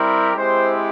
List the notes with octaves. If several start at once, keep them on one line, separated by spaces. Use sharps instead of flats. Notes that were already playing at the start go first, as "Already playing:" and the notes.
Already playing: G3 C4 E4 G4 A#4
G#3 C4 E4 G4 C5